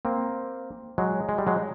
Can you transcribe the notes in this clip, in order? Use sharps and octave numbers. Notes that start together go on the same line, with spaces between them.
A#3 C4
F#3 G#3
G#3
G3
F#3 G#3